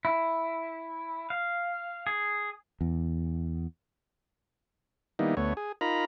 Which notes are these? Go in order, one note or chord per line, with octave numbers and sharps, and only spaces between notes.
E4
F5
G#4
E2
D#3 G3 A#3 B3 D#4 E4
D2 A3 B3 C#5
G#4
D#4 F4 A#4 A#5 B5